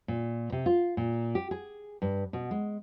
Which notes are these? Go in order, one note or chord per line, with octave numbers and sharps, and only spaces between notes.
A#2
C3
F4
A#2
G4
G#4
G2
B2
G#3